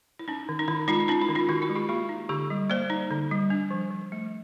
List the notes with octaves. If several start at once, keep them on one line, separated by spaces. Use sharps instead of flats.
E4
C#4 D#4
D#3
D#4
D#3 E4
G#3 D#4 F4
C#4 D#4 F4
E4
D#3
D#4 F4
D#3 E4 F#4
E4 F#4
G#3
F4 G4
A#3 F4 G4
D#4
D3 G4 A4
G3
A#3 C5 D5
D#4
D3
G3
D4
F3
F3
A3